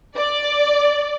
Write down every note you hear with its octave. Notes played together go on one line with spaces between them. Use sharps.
D5